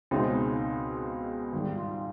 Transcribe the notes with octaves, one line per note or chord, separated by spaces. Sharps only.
C#2 B2 G#3 C4 D#4
G#2 D#3 G3
F4